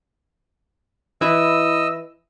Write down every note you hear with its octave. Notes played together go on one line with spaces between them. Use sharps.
E3 E4 D#5 E6